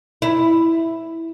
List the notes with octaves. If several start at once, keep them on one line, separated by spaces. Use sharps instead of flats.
E4